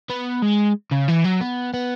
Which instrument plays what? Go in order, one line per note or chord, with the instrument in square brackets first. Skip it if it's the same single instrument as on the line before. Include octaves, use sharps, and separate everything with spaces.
[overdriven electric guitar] B3
G#3
C#3
E3
F#3
B3
B3